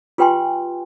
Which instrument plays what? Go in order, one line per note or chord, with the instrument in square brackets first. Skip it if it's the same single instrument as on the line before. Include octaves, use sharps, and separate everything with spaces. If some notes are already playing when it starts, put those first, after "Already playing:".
[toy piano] F4 G4 B4 G5 G#5 C6